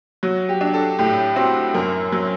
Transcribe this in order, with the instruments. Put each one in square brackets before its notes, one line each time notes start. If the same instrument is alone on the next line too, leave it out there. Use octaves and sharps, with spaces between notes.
[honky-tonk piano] F#3 [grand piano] F#4
[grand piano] G4
[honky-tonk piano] D4
[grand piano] A4
[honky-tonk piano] A2 [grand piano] G4
[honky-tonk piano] C4 [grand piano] F#4
[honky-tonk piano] F#2 [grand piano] A#4
[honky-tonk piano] F#3